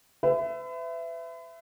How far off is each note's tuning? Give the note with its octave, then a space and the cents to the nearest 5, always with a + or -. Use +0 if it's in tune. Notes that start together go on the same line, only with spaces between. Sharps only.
B4 +40 E5 +15